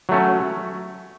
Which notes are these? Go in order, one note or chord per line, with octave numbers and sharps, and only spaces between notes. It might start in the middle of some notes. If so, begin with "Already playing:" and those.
F#3 A3 C#4